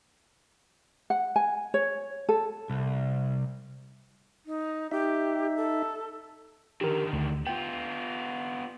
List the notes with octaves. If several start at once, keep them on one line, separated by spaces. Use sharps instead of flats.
F#5
G#5
C#5
A4
C2
D#4
D#4 G4 E5
A4
D3 D#3 G4 A#4
D2
B3 F4 G5